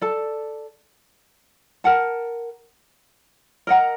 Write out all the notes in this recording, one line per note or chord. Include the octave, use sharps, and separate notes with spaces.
A4 D5 A5
A#4 F#5 A5
A#4 D#5 F#5 A#5